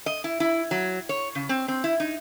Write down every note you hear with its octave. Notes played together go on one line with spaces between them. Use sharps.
D#5
E4
E4
F#3
C#5
C#3
C4
C4
E4
D#4